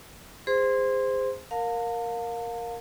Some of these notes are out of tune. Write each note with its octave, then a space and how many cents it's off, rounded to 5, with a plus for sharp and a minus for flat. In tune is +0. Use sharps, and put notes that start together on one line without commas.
G#4 -30 C5 -15 C6 +0
A#4 +0 F5 +25 A5 +45